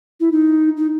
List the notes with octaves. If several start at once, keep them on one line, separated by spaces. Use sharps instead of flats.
E4
D#4
D#4